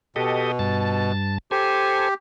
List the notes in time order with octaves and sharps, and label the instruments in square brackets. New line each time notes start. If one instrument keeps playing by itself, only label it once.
[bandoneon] B2 [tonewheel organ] G4 A4 D#5
[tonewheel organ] G2 A5
[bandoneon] G4 [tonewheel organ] A4 C5 G#5